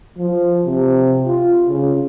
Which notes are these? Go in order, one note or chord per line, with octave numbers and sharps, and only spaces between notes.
F3
C3
F4
C#3